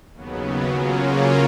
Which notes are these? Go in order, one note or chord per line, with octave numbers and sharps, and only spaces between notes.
D#2 C#3 F#3 B3
C#3 F#3 A#3 C#4 F4